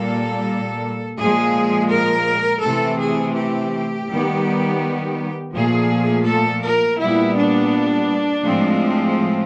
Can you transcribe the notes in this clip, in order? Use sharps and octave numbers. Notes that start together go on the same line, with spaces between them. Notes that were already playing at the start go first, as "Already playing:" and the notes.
Already playing: A#2 G3 A#3 A4
A#2 F3 G#3 G#4
A#4
C3 E3 A3 C4 A4
G#4
G4
D#3 G3 B3
A#2 F3 A3 G#4
A4
A#4
A#2 G3 B3 E4
D4
A2 F3 G#3 C4